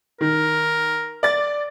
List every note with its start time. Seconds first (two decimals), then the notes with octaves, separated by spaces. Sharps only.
0.21 D#3 A#4
1.23 D5 A6